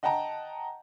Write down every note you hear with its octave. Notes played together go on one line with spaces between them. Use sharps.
D#5 F#5 G5 A5 A#5